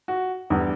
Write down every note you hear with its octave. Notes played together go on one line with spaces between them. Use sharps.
F#4
E2 D3 G3